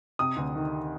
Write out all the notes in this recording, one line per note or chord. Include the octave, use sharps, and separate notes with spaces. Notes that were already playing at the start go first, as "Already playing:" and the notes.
C3 D#6
D2
D#3